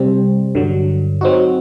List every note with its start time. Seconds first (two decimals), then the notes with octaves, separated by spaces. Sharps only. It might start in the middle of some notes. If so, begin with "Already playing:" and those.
Already playing: C3 G3 C4
0.55 G2 D3 F#3
1.21 F#3 C4 D#4 F#4